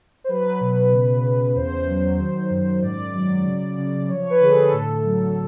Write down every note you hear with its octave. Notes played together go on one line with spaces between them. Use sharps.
C5
F#3 B4
B2
C#3
C#3
E2 C5
F#3
D#3
F#2
G#2 D5
F#3
C#3
C#3
F3 C#5
B4
D3 G#4
A4
A2
F#3